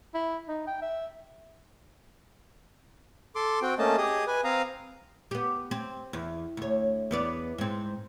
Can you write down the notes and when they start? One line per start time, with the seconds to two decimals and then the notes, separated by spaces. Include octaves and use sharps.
0.14 E4
0.48 D#4
0.67 G5
0.82 E5
3.36 A4 C6 D6
3.62 C4 F#4 G5
3.79 A3 A#3 C#4 D#5 A5
3.97 G4 G#4 D#5 D#6
4.27 B4 G#5
4.44 C4 F5 A#5 D#6
5.31 B3 G4
5.71 C4
6.13 E2
6.57 D2 C#5
7.11 E2 B3 D5
7.58 G#2 C4